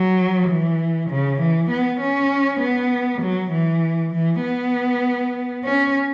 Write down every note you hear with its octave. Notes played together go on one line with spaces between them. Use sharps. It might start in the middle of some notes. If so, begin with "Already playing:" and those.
Already playing: F#3
E3
C#3
E3
B3
C#4
B3
F#3
E3
E3
B3
C#4